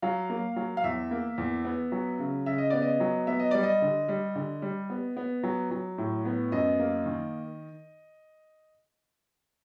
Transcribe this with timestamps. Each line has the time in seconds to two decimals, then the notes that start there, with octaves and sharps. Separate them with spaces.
0.02 F#3 F5
0.30 A#3
0.56 F#3
0.77 F5
0.84 E2 E5
1.11 A#3
1.38 E2
1.65 B3
1.92 F#3
2.19 C#3
2.46 C#3 E5
2.58 D#5
2.70 B3 D5
2.82 D#5
3.00 F#3
3.27 B3 E5
3.39 D#5
3.51 G3 D5
3.63 D#5
3.82 D3
4.08 G3
4.36 D3
4.62 G3
4.90 B3
5.17 B3
5.43 F#3
5.71 F#3
5.98 A2
6.25 B3
6.52 F#2 D#5
6.79 A#3
7.06 D#3